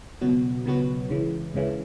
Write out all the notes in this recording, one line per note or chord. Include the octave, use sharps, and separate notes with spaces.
C#2 B2 F#3 B3 F#4
C#2 B2 F#3 B3 F#4
C#2 C#3 E3
C#2 C#3 E3